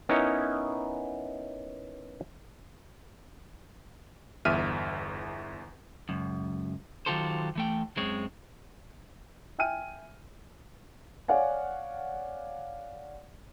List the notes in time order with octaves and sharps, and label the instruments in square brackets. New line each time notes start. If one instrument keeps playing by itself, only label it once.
[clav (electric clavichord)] B3 C#4 D#4 E4 A#4 C#5
[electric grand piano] G1 E2 E5 F6 D#7
[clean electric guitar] C#2 F#2
D#3 F#3 F4 G4 A4 C5
E3 A3 G5
F#2 G#3 C4 C#5
[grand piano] E5 G5 G#5 F6 D#7
C#5 D5 F5 F#5 G#5